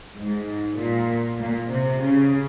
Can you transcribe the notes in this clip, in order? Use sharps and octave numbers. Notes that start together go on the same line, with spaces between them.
G#2
A#2
A#2
C3
C#3